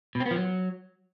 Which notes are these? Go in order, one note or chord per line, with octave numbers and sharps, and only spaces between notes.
B2
C4
B3
F3
F#3